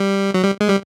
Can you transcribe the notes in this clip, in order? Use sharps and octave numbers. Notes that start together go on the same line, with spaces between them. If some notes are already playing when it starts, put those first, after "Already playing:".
Already playing: G3
F#3
G3
G#3
G3